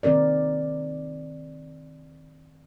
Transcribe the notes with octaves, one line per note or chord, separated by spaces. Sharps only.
D#3 C4 A#4 D5